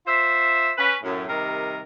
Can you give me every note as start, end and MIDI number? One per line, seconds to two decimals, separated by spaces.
0.07 0.69 65
0.07 0.69 72
0.07 0.69 76
0.78 0.96 61
0.78 0.96 71
1.04 1.24 42
1.04 1.24 45
1.28 1.81 48
1.28 1.81 51
1.28 1.81 55
1.28 1.81 70